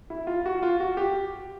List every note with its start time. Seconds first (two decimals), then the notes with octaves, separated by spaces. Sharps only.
0.10 E4
0.27 F4
0.46 F#4
0.63 F4
0.80 F#4
0.97 G4